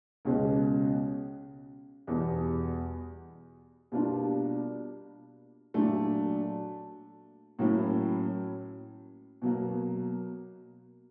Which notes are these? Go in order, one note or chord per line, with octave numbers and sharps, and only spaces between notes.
C#2 B2 G#3 C#4
E2 B2 G3
B2 G3 A#3 D4 F4
A#2 F#3 A3 D4
A2 F#3 A#3 C#4 E4
B2 F#3 A#3